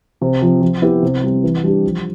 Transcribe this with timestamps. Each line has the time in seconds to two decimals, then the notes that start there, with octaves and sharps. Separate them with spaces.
0.21 C3
0.42 F3 C4
0.62 F3
0.82 B3 E4 G4
1.02 C3
1.23 G3 C4
1.43 E3
1.63 G3 D4 G4
1.84 F3